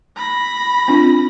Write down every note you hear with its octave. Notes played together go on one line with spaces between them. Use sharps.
B5 A#6
C4 D4 F4